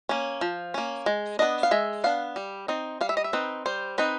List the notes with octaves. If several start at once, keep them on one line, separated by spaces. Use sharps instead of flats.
A#3 C#4
F3
A#3 C#4
G#3
B3 D4 D#5
F5
G#3 E5
B3 D4 F5
G3
C4 D#4
G3 F5
E5
D#5
E5
C4 D#4 B4
G3 C5
C4 D#4 B4